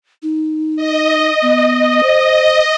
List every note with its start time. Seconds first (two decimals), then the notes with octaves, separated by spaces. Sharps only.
0.23 D#4
0.76 D#5
1.42 B3
2.03 C5